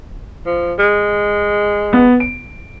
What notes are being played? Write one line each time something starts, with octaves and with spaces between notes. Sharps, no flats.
F3
G#3
B3
D7